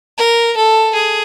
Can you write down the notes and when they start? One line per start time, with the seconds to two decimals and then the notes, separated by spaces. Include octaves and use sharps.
0.18 A#4
0.57 A4
0.94 G#4